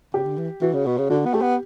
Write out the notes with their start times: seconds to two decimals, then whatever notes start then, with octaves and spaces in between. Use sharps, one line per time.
0.14 C#3 G4
0.25 D3
0.37 E3
0.61 E3 F#4
0.74 C#3
0.86 B2
0.98 C#3
1.10 D3 F#4
1.25 B3
1.34 A3 G4
1.41 B3